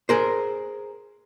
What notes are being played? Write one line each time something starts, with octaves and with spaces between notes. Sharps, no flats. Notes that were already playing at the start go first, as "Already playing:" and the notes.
G#4 A#4 C5